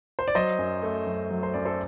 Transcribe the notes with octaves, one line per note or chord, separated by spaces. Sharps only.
C5
D5
F#3 C5 D#5
F#2
A3
F#2
F#3
C5
F#2 D5
A4 C5